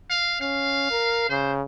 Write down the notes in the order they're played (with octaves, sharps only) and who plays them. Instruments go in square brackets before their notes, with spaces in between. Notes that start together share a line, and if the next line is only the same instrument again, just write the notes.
[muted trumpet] F5
[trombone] C#4 [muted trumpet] F5
[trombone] A#4
[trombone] C#3 [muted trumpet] C5